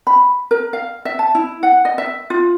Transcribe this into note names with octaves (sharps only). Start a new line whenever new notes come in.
B5
A#4
F5
E5
A5
E4
F#5
D#5
E5
F4